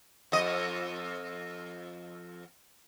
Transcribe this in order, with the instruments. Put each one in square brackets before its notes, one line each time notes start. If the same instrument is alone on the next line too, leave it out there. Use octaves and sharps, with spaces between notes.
[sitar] F2 D#5